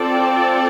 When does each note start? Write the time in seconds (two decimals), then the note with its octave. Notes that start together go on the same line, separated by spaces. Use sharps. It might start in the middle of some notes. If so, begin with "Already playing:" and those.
Already playing: C4 F4 A4 D5
0.10 G5